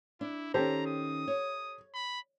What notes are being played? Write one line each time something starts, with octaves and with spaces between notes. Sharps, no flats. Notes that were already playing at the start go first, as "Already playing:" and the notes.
D4 E4
D#3 C#4 G4 A4 C5 A#5
D#6
C#5
B5